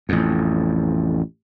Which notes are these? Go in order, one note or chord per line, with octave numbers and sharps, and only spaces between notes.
A1 F2